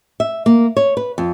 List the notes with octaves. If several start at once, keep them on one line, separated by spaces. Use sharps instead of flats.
E5
A#3
C#5
B4
F2